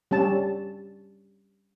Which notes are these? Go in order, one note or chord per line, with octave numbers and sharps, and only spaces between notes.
G3 C#4 A5